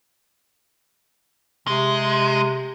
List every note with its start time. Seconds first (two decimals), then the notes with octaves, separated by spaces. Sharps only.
1.67 C3 G#3